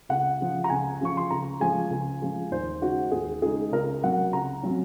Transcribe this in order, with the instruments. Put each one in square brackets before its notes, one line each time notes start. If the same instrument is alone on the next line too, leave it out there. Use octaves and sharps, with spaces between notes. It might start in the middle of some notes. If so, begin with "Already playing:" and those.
[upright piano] C#2 F#5
C#3 F3
A#5
C#2 G#5
C#3 F3 C#6
C6
C#2 A#5
C#3 F3 G#3 G#5
C#2
C#3 F3 G#3
D#2 C5
C#3 G#3 D#4 F#4
D#2 G#4
C#3 G#3 D#4 G#4
C#2 A#4
C3 F#3 C#4 F#5
C#2 A#5
C3 F#3 C#4